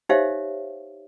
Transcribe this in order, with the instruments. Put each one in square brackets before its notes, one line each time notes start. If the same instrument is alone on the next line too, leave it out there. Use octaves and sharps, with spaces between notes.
[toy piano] D#4 G4 C5 C#5 E5 F5